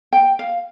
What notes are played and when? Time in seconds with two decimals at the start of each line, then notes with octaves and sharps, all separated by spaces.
0.13 G5
0.39 F5